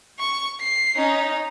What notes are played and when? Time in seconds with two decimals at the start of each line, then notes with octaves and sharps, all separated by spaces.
0.19 C#6
0.60 C7
0.96 C#4 D#4